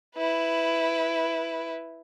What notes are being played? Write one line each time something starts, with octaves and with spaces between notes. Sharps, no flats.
E4 B4